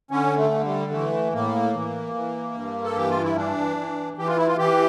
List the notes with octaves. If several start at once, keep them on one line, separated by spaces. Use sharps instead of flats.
D3 C#4
A3
D3
G3
E3 A3
A2 A#3
E3
E3
G2
A4
E3 G4
F4
E4
E3 D4
E3
E3 G4
F4
E4
F4
E3 G4